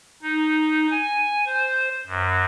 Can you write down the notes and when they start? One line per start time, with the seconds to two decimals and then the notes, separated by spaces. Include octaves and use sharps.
0.23 D#4
0.91 G#5
1.46 C5
2.07 F#2